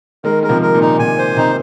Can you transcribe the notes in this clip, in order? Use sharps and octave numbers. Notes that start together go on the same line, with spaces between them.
D#3 G#3 A#4
G#3 A#4
C3 F3
A#4
A#2 D#3
D#4
C3 G#5
C5
C3 D#4